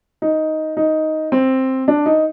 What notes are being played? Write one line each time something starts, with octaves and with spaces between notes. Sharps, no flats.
D#4
D#4
C4
D4
D#4